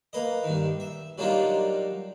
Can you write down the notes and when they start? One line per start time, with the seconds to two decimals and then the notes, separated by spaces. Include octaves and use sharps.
0.13 A#3 B4 D#5
0.44 G2 D#3
0.80 E5
1.18 F#3 G3 A#3 D4 D#4 F4